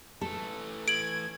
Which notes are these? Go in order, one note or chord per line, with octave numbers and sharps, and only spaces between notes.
E3 A3 A4
G#6 D7 F#7